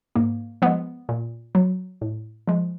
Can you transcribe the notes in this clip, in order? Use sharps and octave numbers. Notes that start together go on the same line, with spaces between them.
G#2 A#3
F3 G#3 B3
A#2
F#3
A2
F3 G#3